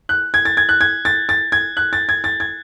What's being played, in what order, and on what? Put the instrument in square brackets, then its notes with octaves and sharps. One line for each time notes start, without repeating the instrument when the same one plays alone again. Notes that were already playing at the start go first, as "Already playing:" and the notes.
[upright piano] F#6
G#6
A6
G#6
F#6
G#6
A6
A6
G#6
F#6
A6
G#6
A6
G#6